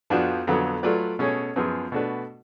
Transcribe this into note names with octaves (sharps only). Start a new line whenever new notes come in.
F2 F3 B3 D4 F#4
F2 D3 F#3 B3
F#3 A3 F4 B4 D5
B2 A3 C#4 G#4 C#5
F#2 F3 B3 F4 G#4
B2 A3 D4 F#4 B4